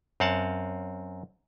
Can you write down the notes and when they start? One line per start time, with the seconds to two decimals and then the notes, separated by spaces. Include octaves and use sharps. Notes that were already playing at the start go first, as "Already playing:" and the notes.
0.20 F#2 C4 F5 F#5 A5